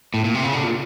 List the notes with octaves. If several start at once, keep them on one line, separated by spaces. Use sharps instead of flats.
A2
A#2
C3
C#3
D3
A#2